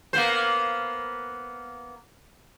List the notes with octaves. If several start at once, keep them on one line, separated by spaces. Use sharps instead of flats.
A#3 B3 C5